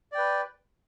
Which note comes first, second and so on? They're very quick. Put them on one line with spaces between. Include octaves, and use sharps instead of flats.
D5 G5 B4